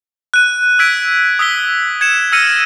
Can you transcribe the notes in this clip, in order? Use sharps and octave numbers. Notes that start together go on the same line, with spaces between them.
F#6 D#7
E6 G#6 B6 D7
D#6 E6 B6 G7
G#6 C#7 E7
E6 F6 A#6 C#7 D#7